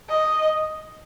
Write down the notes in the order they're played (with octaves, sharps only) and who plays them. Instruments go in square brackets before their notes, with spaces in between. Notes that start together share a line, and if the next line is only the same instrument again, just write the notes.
[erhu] D#5